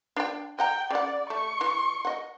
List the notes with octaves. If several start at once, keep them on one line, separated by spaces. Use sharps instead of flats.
D4 D5 G5
D#5 F#5 G5 A#5
C#3 D5 F#5
A3 C#6
E3
D#5 F#5